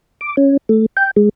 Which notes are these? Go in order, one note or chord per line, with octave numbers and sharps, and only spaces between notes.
D6
C#4
A3
G5
G#3